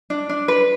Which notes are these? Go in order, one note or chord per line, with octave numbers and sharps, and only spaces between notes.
D4
D4
B4